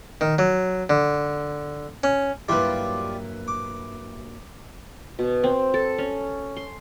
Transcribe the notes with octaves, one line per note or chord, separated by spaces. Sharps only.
D#3
F#3
D3
C#4
G2 F#3 G3 A#3 E4 F4 G4 B4
D6
B2
C4
A4
C#4
C6